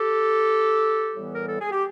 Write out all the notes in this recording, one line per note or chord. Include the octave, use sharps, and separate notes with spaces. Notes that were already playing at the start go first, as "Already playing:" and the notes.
Already playing: G4 A4
A2 E3 G3 B3
A#4
A4
G#4
G4